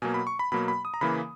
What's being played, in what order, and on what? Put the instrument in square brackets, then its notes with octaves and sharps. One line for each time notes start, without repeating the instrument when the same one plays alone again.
[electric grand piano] B2 F#3 A#3 G#5
B5
C#6
B5
B2 F#3 A#3 B5
B5
D#6
A#5
C#3 E3 A#3 B5